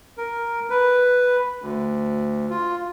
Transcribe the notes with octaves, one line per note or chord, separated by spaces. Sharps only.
A#4
B4
D2
F4